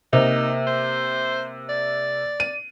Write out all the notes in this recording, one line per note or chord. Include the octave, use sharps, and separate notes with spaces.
C3 A#3 D#4
C5
D5
D#7